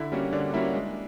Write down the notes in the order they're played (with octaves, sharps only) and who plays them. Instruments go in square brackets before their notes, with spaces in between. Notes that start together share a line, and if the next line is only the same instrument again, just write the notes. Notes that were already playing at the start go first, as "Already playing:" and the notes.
Already playing: [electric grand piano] D3 [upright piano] E4
[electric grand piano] G3 A#3 C#4 F#4
[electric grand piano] D3 [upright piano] D4
[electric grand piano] G3 A#3 C#4 F#4 [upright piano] E4
[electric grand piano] G#3